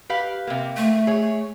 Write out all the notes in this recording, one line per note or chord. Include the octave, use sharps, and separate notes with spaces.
G4 B4 F5
C3 A#3
A3
G#4 C#5